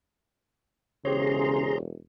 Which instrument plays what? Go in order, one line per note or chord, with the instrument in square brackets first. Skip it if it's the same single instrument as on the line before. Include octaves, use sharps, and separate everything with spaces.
[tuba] E1 [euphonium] C#3 [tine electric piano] G4 C5 C#5 [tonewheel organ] G#4 A#5 C6